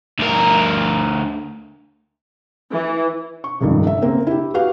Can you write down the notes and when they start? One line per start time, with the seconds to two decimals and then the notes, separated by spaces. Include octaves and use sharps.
0.19 D2 A#4
2.72 E3
3.44 C#6
3.61 F1 C#2 G2 D#3
3.87 E5
4.02 C#3 A#3 C4
4.27 E4 G4
4.54 F#4 G4 B4 F5